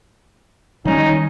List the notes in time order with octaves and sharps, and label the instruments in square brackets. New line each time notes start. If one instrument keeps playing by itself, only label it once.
[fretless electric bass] D#3 G3 [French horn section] C#4 D#4